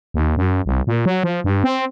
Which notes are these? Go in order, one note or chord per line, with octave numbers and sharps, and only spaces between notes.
D#2
F#2
C2
A#2
F#3
F3
G2
C4